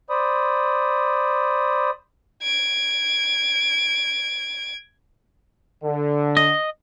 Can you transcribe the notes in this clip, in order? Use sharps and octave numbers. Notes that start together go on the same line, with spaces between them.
C5 D5 B5 D#6
G#6 D7
D3
D#5